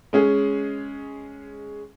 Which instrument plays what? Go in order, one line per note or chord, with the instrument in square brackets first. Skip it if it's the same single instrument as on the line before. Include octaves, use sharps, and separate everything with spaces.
[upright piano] G#3 C#4 G#4